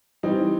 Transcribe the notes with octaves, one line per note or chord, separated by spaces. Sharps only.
E3 G3 C4 D#4